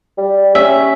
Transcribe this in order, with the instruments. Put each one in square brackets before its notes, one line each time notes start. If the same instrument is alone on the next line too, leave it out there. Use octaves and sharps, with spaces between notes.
[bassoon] G3
[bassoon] C#4 [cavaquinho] E5